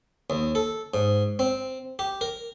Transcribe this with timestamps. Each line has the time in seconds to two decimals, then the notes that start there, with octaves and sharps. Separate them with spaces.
0.30 D#2
0.55 A4
0.94 G#2
1.39 C4
1.99 G4
2.21 A#4